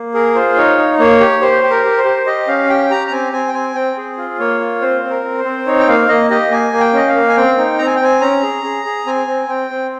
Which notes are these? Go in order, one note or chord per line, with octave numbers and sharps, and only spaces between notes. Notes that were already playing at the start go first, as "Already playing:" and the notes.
Already playing: A#3
G#4 A#4
F4 C5
D#4 C#5
D#4
A#3 C#5
G4
G4 C5
G4
A#4
G4
C5
G4
G4 D#5
C#4 F5
G4 G5
G4 A#5
A#5
C4 G#5
C4 G#5
G5
C4 G#5
C4 G5
G#4
F4
A#3 C#5
F4
C4 C5
C4
A#4
C4
C5
C4
D#4 C#5
G5
A#3 F5
A#3 D#5
G4 D#5
A#3 G#5
A#3
G5
C#4 D#5
F5
A#3
G#5
C4 G5
D#4
C4 A#5
G#5
G5
C4 G#5
C#4 A#5
G#4
G#4
G#4
C4 G#5
C4
C4 G5
C4